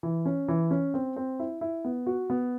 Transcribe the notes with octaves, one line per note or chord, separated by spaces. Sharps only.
E3
C#4
E3
C#4
C4
C4
E4
E4
B3
F#4
B3